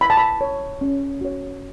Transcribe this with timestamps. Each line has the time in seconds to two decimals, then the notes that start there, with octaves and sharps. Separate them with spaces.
0.01 E4 B5
0.10 A5
0.17 B5
0.41 C#5
0.81 C#4
1.21 F#4 C#5